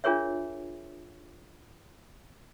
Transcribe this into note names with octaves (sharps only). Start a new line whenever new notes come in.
D4 F4 G#4 A#4 C#5 E5